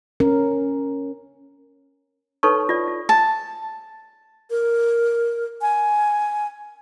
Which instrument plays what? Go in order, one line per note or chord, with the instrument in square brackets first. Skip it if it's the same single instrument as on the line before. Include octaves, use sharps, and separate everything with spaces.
[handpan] C#4 A#4
[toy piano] D#4 A4 B4 C#5 A5 C#6
F4 D5
F4
[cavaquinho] A5
[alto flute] A#4
G#5